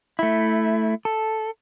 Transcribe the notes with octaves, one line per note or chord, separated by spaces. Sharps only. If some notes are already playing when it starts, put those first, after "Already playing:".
A3 E4
A4